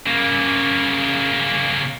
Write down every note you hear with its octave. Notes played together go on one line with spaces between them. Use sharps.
C#3 A#3